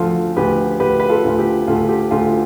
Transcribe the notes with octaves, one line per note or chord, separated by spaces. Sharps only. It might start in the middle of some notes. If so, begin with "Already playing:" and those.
Already playing: D2 F3 F4 A4
D2 G4 B4
D2 G4 B4
B4
F4 A4
D2 F4
G4
D2 F4 A4
G4
D2 F4 A4